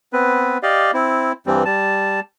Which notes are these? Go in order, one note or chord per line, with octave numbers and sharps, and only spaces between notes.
B3 C4 B4
G4 D5 D#5 F5
C4 E4
G2 E3 G3 C4
G3 A5